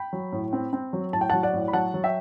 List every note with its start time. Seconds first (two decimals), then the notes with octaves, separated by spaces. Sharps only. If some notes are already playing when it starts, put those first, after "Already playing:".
Already playing: G5 B5
0.13 F#3
0.32 A2
0.53 C4
0.73 C4
0.93 F#3
1.13 A2 A5
1.21 G5
1.30 F#3 F#5 A5
1.43 D5 F#5
1.54 A2
1.68 B5
1.73 F#3 F#5 A5
1.94 F#3
2.04 E5 G5